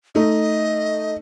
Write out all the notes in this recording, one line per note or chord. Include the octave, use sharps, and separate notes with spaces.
A3 D#4 D#5